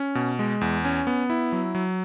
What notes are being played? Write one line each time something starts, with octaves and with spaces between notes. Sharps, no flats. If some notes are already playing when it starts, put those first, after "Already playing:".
Already playing: C#4
B2
G#3
E2
C#4
B3
E4
F#3
F#3